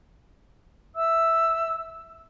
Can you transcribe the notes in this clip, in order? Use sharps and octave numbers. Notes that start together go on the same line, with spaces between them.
E5 E6